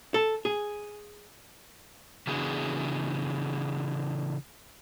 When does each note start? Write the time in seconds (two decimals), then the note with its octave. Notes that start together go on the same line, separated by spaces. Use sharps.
0.14 A4
0.45 G#4
2.27 C#3 E3 B3 D4 F#4 G#4